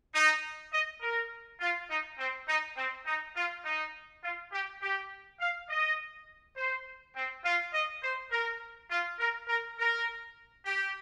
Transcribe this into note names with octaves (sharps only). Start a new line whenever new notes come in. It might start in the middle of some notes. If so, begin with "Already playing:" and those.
D#4
D#5
A#4
F4
D#4
C4
D#4
C4
D#4
F4
D#4
F4
G4
G4
F5
D#5
C5
C4
F4
D#5
C5
A#4
F4
A#4
A#4
A#4
G4